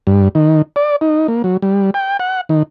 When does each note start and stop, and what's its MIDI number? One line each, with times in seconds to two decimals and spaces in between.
0.07 0.29 43
0.35 0.62 51
0.76 0.96 74
1.01 1.27 63
1.28 1.42 58
1.44 1.57 54
1.62 1.90 55
1.94 2.17 79
2.20 2.41 78
2.49 2.63 51